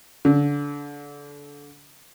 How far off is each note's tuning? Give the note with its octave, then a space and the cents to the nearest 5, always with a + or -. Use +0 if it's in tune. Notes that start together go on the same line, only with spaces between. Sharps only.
D3 -30